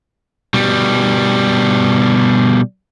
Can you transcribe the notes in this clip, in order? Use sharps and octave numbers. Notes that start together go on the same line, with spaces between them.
B2 G3